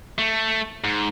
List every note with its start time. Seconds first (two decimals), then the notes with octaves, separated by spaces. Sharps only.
0.18 A3
0.84 G#2